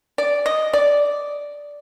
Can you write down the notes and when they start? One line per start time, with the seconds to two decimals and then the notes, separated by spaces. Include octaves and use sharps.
0.18 D5
0.46 D#5
0.73 D5